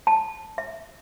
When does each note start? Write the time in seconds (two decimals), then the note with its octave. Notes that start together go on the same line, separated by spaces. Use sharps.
0.07 A5
0.58 E5